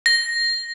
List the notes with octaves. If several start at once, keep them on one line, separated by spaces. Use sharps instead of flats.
A#6